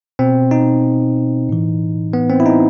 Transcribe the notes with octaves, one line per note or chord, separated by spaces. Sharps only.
B2 C4
D#4
A2 E3
B3
C4
E4
D#4